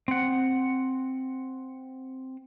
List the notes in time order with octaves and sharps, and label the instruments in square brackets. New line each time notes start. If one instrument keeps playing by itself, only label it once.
[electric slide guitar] C4 F#5